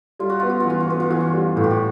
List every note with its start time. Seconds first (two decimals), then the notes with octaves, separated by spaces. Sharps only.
0.19 G3 F4
0.30 F#4
0.40 B3 F4
0.50 F#4
0.60 F4
0.65 E3 F#4
0.80 F4
0.88 B3 F#4
1.00 F4
1.10 E3 F#4
1.20 F4
1.33 G3
1.56 A2 F#4
1.64 G4
1.71 F#4